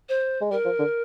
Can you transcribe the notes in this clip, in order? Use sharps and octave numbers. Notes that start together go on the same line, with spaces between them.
C5
G#3
G3 A#4
F3
D3